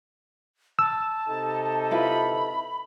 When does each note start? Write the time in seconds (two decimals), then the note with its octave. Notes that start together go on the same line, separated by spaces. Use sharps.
0.79 A5 E6
1.28 C3 D#4 A4
1.91 E4 F4 B4 B5